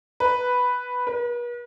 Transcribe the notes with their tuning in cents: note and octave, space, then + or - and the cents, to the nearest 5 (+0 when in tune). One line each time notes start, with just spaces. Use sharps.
B4 +0
B4 -45